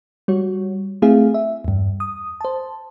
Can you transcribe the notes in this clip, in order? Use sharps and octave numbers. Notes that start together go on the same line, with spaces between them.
G3 F#4 C#5
A3 C4 E4 G#4 F5
E5
E2 G2
D#6
C5 A5